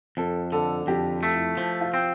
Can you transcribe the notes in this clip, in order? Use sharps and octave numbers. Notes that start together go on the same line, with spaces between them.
F2 A4
D3 A4
F2 G4
A3
E4
F3
F4
C4